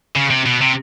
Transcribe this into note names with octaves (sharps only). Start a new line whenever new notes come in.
C#3
C3
B2
C3